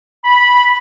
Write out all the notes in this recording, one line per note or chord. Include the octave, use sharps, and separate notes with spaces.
B5